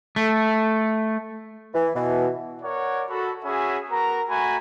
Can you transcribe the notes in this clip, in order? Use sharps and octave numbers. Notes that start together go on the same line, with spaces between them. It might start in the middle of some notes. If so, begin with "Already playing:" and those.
A3
E3
B2 E3
A#4 C#5 D5 F#5
F#4 A4 B5
C#4 F#4 G#4 E5 G#5 B5
B3 F#4 A#4 A#5
A3 F#4 G#5 A#5 B5